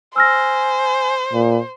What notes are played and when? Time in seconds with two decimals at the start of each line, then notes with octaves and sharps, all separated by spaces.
0.16 C5 G#5 E6 F6 A#6
1.33 A#2